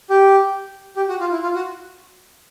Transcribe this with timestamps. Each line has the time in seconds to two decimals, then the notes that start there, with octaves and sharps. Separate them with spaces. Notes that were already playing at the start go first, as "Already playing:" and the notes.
0.10 G4
0.97 G4
1.09 F#4
1.20 F4
1.32 E4
1.43 F4
1.55 F#4